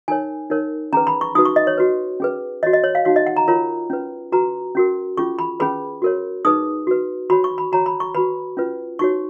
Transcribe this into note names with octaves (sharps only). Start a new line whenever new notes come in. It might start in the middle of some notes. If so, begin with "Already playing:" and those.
D#4 A#4 C#5 G#5
D#4 A#4 C#5
C#4 G#4 B4 A#5
B5
C#6
D#4 F#4 B4 D#6
C#6
D#5
C#5
F#4 B4
C#4 G#4 B4
F#4 C#5 D#5
D#5
C#5
F5
D#4 F#4 C#5 F5
D#5
F#5
A#5
F4 A#4 C#5 A#5
C#4 F4 B4
F#4 B4 A#5
C#4 F#4 A#4
C#4 F4 G#4 C#6
B5
C#4 G#4 B4 B5
F#4 A#4 C#5
D#4 G#4 B4 D#6
F#4 B4
F#4 C#5 B5
C#6
B5
F#4 C#5 A#5
B5
C#6
F#4 B4 B5
C#4 F4 B4
D#4 F#4 C#5 C#6